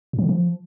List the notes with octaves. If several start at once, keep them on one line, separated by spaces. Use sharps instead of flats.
A2
F3
C#3
F3